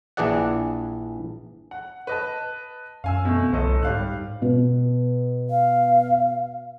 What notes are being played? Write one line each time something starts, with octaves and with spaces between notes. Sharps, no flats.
A#1 E3 D4 G#4 D5 F#5
F#5
B4 D#5 A5
F#2 F5 G#5 E6
B2 A3
G1 C2 A4 D#5
G#2 G3 F5 F#6
B2
F5